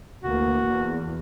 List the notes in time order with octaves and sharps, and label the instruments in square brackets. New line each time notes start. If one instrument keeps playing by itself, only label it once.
[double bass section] D2 E3 A#3 [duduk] F#4
[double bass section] E2